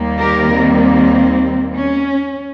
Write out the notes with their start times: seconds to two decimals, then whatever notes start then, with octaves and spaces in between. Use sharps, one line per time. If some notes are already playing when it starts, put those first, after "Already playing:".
Already playing: D#2 D#3 G3 A#3
0.19 G4 A#4
0.51 C4
1.75 C#4